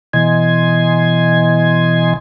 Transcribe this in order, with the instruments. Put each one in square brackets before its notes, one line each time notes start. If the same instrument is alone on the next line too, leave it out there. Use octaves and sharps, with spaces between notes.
[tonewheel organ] B2 E3 D#5 G#5 C6 G#6